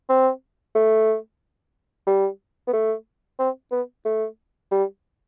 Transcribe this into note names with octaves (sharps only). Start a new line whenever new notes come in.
C4
A3
G3
B3
A3
C4
B3
A3
G3